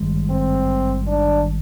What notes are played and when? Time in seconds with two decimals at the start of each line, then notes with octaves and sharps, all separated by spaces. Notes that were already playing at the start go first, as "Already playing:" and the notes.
Already playing: G#1 G2 D#3 G#3
0.30 C4
1.07 D4